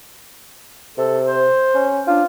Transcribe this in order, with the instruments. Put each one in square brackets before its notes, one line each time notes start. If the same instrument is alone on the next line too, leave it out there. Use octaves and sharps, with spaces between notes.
[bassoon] C3 [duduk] A4
[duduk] C5
[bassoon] C#4
[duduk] D4 [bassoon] F4